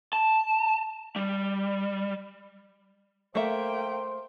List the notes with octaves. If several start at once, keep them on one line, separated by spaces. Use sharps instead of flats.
A5
G3
A3 A#3 C5 E5 G5